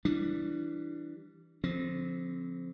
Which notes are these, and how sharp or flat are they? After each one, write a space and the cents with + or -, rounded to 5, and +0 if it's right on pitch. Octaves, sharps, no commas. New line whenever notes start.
E3 +0 G3 +0 D4 +0
D3 -35 F3 +0 C4 +0